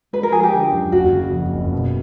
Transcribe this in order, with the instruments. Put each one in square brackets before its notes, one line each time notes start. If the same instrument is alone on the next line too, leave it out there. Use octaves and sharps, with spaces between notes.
[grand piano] G#3 [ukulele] B4
[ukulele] A#4
[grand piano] F3 [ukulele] G#4
[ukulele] G4
[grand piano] D3
F#2
[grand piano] F#1 [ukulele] F#4
[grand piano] C#3
F2
F#1
B2